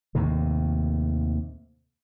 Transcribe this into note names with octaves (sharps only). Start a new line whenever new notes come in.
D#2 A2 C3